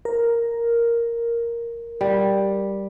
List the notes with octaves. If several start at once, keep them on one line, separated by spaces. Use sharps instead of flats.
A#4
G3